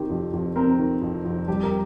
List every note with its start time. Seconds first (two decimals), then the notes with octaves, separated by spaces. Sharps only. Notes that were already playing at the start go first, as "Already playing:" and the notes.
Already playing: D#3 C4 G4
0.10 F2
0.33 F2
0.56 C4 A#4
0.79 D#3
1.02 F2
1.25 F2
1.48 G3 G4
1.63 A#4